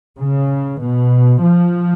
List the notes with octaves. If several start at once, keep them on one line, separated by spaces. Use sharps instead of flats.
C#3
B2
F3